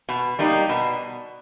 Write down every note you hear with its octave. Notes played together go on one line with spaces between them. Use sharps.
B2
G3 A#3 D#4
B2